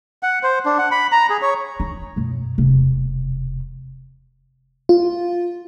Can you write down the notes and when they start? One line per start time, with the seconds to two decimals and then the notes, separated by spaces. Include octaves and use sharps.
0.23 F#5
0.43 C5
0.66 D4
0.79 F#5
0.92 B5
1.12 A#5
1.30 G#4
1.42 C#5
1.80 D#4
2.16 F#2 B2
2.58 E1 C3
4.89 F4